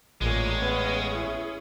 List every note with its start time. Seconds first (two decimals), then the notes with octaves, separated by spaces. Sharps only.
0.21 A1 A#2 G#3 C#4 G#4
0.62 B3
1.15 E4